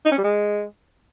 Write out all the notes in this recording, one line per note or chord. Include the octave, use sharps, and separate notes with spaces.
D#4
C#4
G3
G#3